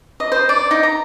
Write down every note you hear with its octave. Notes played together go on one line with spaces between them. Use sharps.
D#5
C5
D5
D#4
A#5